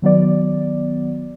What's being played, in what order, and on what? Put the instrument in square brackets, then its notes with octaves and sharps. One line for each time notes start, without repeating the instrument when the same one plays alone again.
[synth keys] D#3 F#3 B3 D5